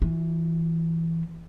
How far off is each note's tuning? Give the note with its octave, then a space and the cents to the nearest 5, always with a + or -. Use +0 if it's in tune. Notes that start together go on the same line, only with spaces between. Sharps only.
E3 +0 F4 +45